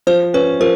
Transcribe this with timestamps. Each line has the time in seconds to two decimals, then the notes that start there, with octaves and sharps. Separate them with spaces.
0.07 F3 C5
0.34 C#4 B4
0.60 F3 A#4